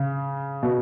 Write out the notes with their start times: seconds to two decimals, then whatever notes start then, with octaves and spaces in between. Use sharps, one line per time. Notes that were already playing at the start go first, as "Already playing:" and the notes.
Already playing: C#3
0.63 B2